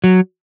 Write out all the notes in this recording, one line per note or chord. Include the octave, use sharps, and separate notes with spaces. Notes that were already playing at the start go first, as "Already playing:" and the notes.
F#3